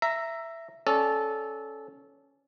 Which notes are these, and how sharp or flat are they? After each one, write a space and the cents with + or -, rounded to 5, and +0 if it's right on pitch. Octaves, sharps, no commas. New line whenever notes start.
E5 +10 A#5 -5
C#4 +0 A4 -15 D5 +0